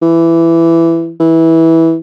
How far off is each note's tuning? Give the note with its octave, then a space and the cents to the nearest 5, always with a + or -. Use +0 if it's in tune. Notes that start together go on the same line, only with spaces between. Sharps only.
E3 +15
E3 -15